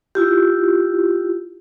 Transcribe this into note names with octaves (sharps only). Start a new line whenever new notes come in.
E4 F4 G4